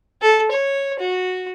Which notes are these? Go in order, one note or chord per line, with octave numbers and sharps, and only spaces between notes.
A4
C#5
F#4